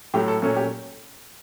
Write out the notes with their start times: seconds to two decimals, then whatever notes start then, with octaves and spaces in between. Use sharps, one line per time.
0.14 A2 F#3 A3 G4
0.28 A4
0.42 A#2 F#3 A3 C#4 A4
0.57 G4